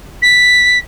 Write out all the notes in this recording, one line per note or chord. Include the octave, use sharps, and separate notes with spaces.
B6